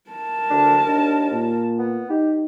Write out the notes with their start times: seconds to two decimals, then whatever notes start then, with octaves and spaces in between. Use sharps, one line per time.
0.10 A#4 A5
0.50 D2 D4
0.87 D#2 D4
1.31 A#2
1.79 B3
2.10 D#4 G4